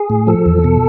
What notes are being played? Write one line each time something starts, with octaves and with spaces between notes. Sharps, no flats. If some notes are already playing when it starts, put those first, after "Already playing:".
Already playing: G#4
A2
F3 A4
E2
B2